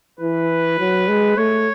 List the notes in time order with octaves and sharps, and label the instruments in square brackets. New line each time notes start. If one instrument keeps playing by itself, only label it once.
[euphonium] E3 [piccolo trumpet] B4
[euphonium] F#3
G#3
[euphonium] A3 [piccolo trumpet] C#5